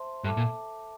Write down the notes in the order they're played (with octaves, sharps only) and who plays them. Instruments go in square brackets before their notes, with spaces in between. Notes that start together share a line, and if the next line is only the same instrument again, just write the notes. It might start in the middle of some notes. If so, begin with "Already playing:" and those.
Already playing: [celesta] C5 E5 A5 C6
[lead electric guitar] G2 [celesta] A4 E5 A5 D6
[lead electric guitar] A#2